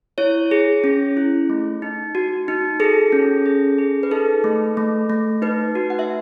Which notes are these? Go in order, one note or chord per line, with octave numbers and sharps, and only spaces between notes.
E4 C#5
G#4
C#4
E4
A3
D#4
F#4
D#4
G#4 A4
C#4
G#4
G#4
B4
D#4 A4
A3
A3
A3
D#4 B4
F#4
F#5
E5